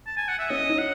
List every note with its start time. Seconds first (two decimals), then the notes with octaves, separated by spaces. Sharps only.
0.06 A5
0.17 G#5
0.28 F#5
0.39 E5
0.50 C#4 D#5
0.69 D#4
0.78 F#5